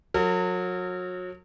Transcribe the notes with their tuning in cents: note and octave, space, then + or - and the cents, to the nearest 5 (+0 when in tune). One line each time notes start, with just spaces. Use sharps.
F#3 -30 A#4 -45